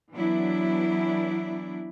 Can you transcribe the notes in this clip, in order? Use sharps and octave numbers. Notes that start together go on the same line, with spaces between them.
E3 F#3 B3 D4 E4